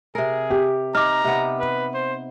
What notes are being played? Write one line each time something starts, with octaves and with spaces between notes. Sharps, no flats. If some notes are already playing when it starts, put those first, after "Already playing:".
C3 G#4 A#4
G4
D#4 A#5 D6 F6
C3 B3
B4
C5